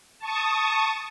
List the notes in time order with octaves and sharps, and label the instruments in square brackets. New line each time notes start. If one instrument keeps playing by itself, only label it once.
[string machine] A5 C#6 D#6